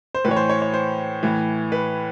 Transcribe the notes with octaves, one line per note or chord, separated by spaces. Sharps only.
C5
A2 E3 B4 C#5
C5
C#5
C#5
C5
A2 E3
B4